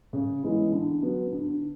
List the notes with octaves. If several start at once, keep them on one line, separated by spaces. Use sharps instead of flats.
C#3
E3 G#3 B3 E4
D3
F#3 B3 F#4
D3